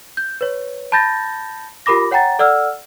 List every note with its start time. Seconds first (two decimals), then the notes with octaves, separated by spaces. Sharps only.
0.17 G6
0.41 B4 C#5
0.92 A5 B5 G6 A6 A#6
1.86 F4 G4 A#4 B5 D6 A#6
2.11 C#5 F#5 G5 A#5 A6
2.39 A4 D5 F#5 E6 F6